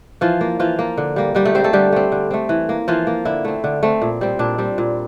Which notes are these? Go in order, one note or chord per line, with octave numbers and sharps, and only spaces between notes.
E3 F3 F4
A#3
E3 F3 F4
A#3
D3
G3 A#3
D3 G3 G4
A3 A4
G3 A#3 C4 C5
A3 A4
D3 G3 G4
A3 C4
D3
A3 C4
E3
A#3
E3 F3 F4
A#3
D3 E4
A3 C4
D3
A3 C4
A#2
G3 C4
A#2 D4
G3 C4
A#2